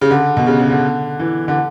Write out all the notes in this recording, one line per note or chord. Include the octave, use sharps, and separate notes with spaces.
C#3
D3
B2
C#3
C#3
D3
E3
D3